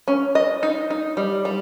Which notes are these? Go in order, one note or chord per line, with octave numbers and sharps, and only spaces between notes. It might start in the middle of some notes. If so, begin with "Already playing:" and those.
C#4
D#5
D#4
D#4
G3
G3